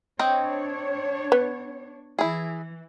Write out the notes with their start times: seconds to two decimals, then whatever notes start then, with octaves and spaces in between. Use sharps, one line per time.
0.19 C4 D4 C#5 D#5 G5
1.32 B3
2.19 E3 E4 G#4